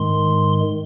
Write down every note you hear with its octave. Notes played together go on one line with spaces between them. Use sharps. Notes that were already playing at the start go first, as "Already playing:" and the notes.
Already playing: G#2 D#3 G#3 C6